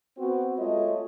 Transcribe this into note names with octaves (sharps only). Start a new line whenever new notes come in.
B3 C4 F#4
G#3 A3 F4 C#5 D#5